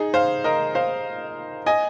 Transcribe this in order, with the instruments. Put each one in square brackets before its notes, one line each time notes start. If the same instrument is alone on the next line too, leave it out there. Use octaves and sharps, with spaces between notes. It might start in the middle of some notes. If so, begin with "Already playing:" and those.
Already playing: [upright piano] D#4 G#4
C5 F5
A#4 D#5
C5 F5
D#5 G#5